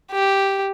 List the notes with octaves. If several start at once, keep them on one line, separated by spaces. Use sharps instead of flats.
G4